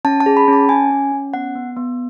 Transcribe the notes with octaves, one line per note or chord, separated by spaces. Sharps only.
C#4 A5
A5
G#4
B5
C#4
A5
C#4 G#5
C#4
C#4
B3 F#5
B3
B3